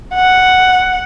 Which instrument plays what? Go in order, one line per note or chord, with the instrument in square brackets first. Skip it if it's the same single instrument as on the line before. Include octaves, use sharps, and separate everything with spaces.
[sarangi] F#5